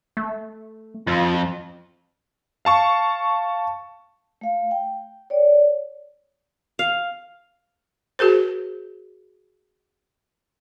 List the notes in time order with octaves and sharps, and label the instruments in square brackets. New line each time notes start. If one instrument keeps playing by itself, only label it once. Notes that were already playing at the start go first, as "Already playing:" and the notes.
[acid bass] A3
[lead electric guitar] F2 [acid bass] F4
[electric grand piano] F5 A5 C#6
[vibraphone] A3 F5
G5
C#5 D5
[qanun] F5
[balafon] F#4 G#4 A#4 C5